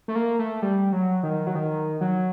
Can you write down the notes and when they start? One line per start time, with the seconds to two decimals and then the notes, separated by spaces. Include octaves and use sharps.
0.08 A3
0.15 A#3
0.39 A3
0.62 G3
0.92 F#3
1.23 D#3
1.47 F#3
1.55 D#3
2.01 F#3